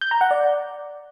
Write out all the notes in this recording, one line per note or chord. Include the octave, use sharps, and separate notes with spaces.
G6
A#5
F#5
D5